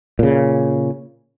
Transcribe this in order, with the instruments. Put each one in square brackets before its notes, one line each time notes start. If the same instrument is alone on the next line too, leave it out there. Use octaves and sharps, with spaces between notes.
[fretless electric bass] A#2 C#3